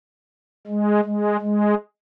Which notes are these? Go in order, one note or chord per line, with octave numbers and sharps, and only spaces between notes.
G#3
G#3
G#3